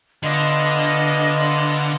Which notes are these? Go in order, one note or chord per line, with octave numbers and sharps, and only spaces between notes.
D3 B3 D4 F4 D#5